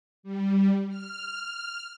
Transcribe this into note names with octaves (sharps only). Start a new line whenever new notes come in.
G3
F6